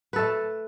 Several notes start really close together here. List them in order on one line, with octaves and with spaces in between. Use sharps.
B4 A4 A3